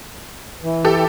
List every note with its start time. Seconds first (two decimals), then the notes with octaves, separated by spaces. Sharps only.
0.63 E3
0.85 G4 A4